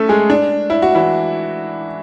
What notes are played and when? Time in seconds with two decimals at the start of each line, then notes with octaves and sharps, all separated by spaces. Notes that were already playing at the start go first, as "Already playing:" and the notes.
Already playing: A3 C#4 A4
0.09 G#3 G#4
0.30 D4
0.70 E4
0.82 F#4
0.95 E3 E4